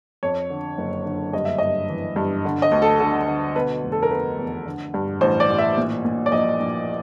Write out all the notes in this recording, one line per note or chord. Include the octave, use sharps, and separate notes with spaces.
F2 C#5
D3
F#1
D3
G2 D#5
E5
G2 D#5
E3
G2
D3
D#5
D2
A4
D3 A4
D3
B2 B4
F1
A4
A#4
B2 B4
E2
D3
G2
A1 C5
D5
A1
E5
A#2
A#2
D5
A#1 D#5
A#1